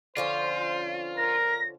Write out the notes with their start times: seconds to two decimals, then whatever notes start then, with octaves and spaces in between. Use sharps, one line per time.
0.17 D3 F3 C#4 F4 C5
1.17 A#4 A#6